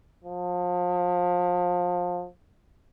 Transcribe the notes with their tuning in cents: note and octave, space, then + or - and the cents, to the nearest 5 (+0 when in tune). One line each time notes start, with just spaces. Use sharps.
F3 +30